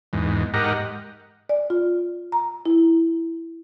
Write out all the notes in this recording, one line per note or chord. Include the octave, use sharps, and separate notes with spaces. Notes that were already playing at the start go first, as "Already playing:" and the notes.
E2 G#2
G#2 G4 A#4 D#5 F#5
D5
F4
A#5
E4